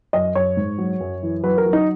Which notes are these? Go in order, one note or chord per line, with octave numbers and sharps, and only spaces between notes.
F#2 D#5
F#2 C#5
G#2
F#3
F#2
E3
F#3 B4
A#4
F#3
D#4